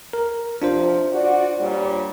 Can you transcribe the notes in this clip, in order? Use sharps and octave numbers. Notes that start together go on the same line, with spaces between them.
A#4
C3 F3 D4 F4 C5
F#4 D5
A#2 G3 C#5